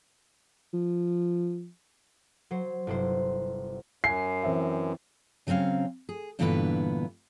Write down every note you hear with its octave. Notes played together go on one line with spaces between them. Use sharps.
F3
F#3 C5
G1 C3 E4 C5
F#2 G#5 C7
E3 C4 E5
C#3 F#3 C4 C#4 F5
G#4
G2 A#2 D3 E3 B3 B4